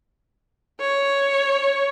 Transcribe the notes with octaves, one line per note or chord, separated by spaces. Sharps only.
C#5